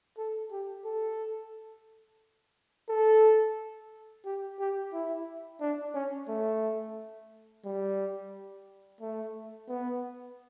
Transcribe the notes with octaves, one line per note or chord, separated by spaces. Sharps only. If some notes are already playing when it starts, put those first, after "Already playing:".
A4
G4
A4
A4
G4
G4
E4
D4
C#4
A3
G3
A3
B3